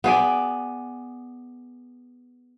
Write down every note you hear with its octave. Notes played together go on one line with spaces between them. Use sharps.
B3 G#4 D5